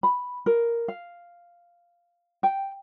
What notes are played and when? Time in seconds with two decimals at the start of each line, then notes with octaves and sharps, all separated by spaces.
0.03 B5
0.46 A#4
0.88 F5
2.43 G5